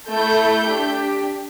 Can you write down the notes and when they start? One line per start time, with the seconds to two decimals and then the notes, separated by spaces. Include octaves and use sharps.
0.09 A3 E4 A4 G6
0.67 D4 G4